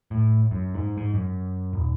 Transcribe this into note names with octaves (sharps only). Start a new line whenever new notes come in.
A2
F#2
G#2
G#2
F#2
D#1